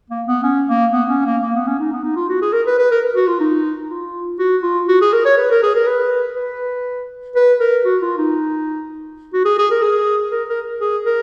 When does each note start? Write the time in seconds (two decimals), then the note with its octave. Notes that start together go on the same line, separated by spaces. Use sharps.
0.10 A#3
0.27 B3
0.43 C#4
0.69 A#3
0.93 B3
1.10 C#4
1.25 A#3
1.42 A#3
1.55 B3
1.67 C#4
1.79 D#4
1.92 B3
2.04 D#4
2.16 F4
2.29 F#4
2.42 G#4
2.53 A#4
2.67 B4
2.79 B4
2.91 A#4
3.16 F#4
3.27 F4
3.40 D#4
3.90 F4
4.39 F#4
4.63 F4
4.88 F#4
5.01 G#4
5.13 A#4
5.25 C#5
5.38 B4
5.51 A#4
5.63 G#4
5.75 A#4
5.87 B4
6.36 B4
7.36 B4
7.60 A#4
7.85 F#4
8.02 F4
8.18 D#4
9.33 F#4
9.45 G#4
9.58 G#4
9.71 A#4
9.82 G#4
10.31 A#4
10.49 A#4
10.81 G#4
11.06 A#4